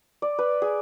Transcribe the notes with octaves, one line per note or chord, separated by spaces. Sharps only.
D5
B4
G#4